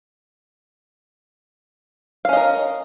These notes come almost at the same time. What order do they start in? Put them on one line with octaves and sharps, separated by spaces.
F5 C#4 D#5 A#4